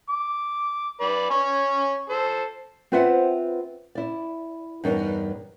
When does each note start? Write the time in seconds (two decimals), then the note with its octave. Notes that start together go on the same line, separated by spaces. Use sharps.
0.09 D6
1.01 B4 D5
1.30 C#5 G#5
2.10 A4 C5
2.92 C4 F4 B4 C5 E5 F#5
3.95 E4 D5
4.84 E2 G2 B3 D#4 A#4 C#5